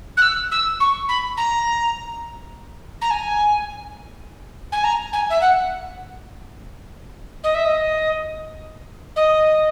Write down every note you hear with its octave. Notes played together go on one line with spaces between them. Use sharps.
F#6
E6
E6
C#6
B5
A#5
A#5
G#5
G#5
A#5
G#5
E5
F#5
D#5
E5
D#5
D#5